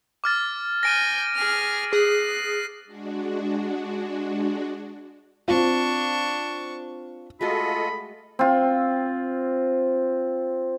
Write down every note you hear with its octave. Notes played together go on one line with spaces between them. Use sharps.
D6 F6 A6
G#5 G6 A#6 D7 D#7
G#4 F6
G#4 F#6 C7
G#3 D4 F#4
C4 D4 F4 C#6
G#3 A3 F4 F#4 A4 D#5 B5
C4 F4